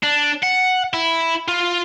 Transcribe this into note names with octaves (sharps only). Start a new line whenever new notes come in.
D4
F#5
E4
F4